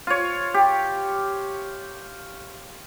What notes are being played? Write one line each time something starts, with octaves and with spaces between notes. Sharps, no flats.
F4 C#5
G4